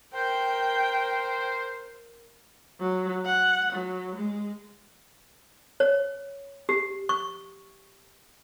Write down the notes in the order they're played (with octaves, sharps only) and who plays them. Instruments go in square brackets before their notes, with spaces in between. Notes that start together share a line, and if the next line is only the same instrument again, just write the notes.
[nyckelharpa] A#4 [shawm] C5 [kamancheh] G5
[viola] F#3
F#5
F#3
G#3
[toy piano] C#5
G4
C#6